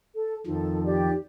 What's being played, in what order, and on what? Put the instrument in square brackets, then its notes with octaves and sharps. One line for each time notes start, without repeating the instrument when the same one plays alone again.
[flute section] A4
[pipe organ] F2 D#3 F3 [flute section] A4
[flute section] G4 D5